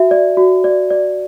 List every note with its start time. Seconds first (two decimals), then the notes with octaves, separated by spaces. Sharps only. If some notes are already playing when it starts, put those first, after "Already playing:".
Already playing: F#4 E5
0.11 D5
0.37 F#4
0.64 D5
0.90 D5